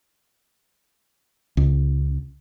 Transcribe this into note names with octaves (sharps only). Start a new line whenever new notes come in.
C#2